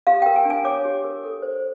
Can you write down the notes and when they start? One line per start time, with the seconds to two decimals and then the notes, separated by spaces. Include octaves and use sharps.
0.07 G4 F5
0.22 G5
0.26 A#4
0.36 G#5
0.45 D4
0.50 G#5
0.65 C#5 D6
0.85 G4
1.05 A#4
1.24 A4
1.42 C5